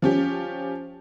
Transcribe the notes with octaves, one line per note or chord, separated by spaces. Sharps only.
F3 C#4 G4